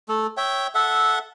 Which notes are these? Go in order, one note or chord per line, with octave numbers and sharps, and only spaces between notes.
A3 A4
C#5 E5 G5
A4 E5 F#5